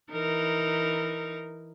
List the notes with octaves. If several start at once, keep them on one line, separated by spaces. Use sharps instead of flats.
E3 D#4 A#4